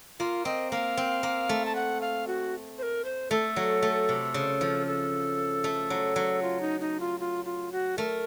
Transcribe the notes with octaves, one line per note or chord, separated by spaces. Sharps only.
A#3 F4
C4 D#5
A#3 F5
C4
A#3
A3
A5
F#5
F5
F#4
C5
A#4
C5
A3 A4
F#3
A3
C3
C#3
F3
A4
A3
F#3
F#3
F4
D#4
D#4
F4
F4
F4
F#4
A3 A#4